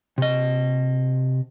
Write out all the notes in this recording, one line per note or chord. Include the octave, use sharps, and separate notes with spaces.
C3 D#5